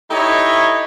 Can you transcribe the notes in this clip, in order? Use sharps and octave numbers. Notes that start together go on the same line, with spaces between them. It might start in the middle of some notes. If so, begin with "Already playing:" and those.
D#4 E4 G4 A4 C#5 D#5